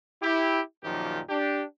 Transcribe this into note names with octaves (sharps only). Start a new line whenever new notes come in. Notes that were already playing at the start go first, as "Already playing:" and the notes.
E4 G4
F#2 A#2 D#3 F3 D#4 G4
D4 G4